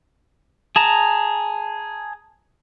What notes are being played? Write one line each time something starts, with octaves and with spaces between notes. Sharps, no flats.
G#4 A5 A#5